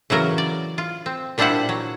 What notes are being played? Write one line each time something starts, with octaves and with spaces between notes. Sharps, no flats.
C#3 E3 F#3 A#4
D5
F4
C4
A#2 G3 D4 E4 C5 F#5
F#3